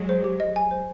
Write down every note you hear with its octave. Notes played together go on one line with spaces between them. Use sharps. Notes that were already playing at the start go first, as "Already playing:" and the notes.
Already playing: F#3 G#3
C5
G4
D#5
G#5
C5